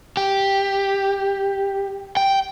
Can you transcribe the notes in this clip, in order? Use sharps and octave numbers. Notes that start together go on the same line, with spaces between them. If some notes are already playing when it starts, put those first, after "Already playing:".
G4
G5